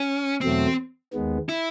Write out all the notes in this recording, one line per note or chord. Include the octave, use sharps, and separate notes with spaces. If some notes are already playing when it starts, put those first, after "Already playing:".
Already playing: C#4
E2 B2 F#3 A3 C4
D#2 D#3 G#3 B3
E4